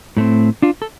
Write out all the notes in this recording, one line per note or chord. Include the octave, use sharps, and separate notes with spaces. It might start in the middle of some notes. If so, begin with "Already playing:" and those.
A2 A3 C4
D4 F4
A4